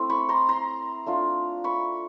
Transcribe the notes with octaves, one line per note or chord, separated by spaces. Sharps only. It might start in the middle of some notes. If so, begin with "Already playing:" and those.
Already playing: A3 C4 E4
B5 C#6
A#5 C6
A#5 C6
A3 D4 F4
B5 C#6